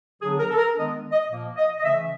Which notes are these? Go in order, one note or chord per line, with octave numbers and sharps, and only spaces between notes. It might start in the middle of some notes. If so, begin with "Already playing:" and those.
D3 F#3 B3 D4 G#4
A#4
A4
A#4
D#3 G#3 B3 D4 D#5
D#5
A#2 F3 A#3
D#5
D#5
C#3 E3 A3 C#4 E5